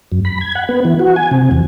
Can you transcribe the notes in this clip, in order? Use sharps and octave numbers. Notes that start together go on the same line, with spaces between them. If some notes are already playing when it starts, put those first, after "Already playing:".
F#2
B5
G#6
F#5
B3
E3
F#4
G#5
C3
E2